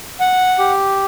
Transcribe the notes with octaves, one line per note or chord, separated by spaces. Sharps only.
F#5
G4